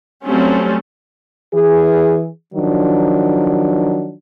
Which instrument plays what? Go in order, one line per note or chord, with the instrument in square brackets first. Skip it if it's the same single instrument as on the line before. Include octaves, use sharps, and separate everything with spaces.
[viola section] F#3 G3 A3 C4 C#4
[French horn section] E3 G#4
D#3 F3 F#3 D4